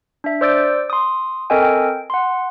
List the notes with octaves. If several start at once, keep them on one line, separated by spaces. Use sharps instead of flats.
D4 E5
C5 D5 E6 G6 A6 D7
C6 D#6
C4 A4 A#4 D#5 G5 G#5
G5
F#5 C6